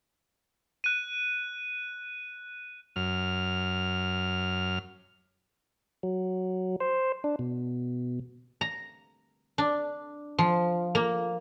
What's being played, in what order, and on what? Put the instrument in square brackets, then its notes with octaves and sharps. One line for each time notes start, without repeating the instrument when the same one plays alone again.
[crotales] F#6 D#7
[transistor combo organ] F#2 F6
[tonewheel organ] F#3
C5
D4
B2
[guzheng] A#5
D4
F3
A#3